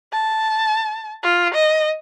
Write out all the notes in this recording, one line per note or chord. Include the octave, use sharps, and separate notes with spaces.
A5
F4
D#5